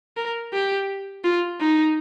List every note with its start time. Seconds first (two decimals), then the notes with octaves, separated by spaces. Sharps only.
0.17 A#4
0.53 G4
1.24 F4
1.60 D#4